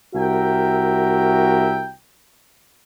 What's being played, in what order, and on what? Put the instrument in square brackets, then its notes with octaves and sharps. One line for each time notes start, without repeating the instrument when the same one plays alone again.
[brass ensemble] C2 F#4 A#4 E5 G5